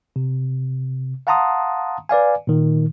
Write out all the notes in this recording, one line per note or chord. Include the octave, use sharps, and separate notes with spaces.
C3
F5 F#5 A5 A#5 C6 D#6
B4 D5 F5 G#5
A#2 D#3